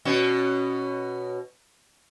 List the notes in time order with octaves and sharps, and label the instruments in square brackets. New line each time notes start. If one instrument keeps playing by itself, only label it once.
[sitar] B2 C#4